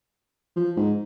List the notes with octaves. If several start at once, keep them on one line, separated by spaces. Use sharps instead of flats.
F3
G#2